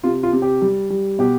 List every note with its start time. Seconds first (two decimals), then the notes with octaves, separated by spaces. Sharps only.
0.04 C3 F4
0.23 F4
0.33 C3
0.42 G4
0.62 G3
0.90 G3
1.19 B2 G4